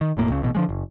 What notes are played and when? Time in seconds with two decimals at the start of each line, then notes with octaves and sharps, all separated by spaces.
0.01 D#3
0.17 E1 A2 A#3
0.30 C#2 C#3
0.42 A1 B2
0.55 D3 F3 G#3
0.69 F#1